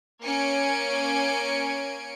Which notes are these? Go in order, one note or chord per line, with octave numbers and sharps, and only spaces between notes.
A#3 C#4 G#5 G#6 C#7 D7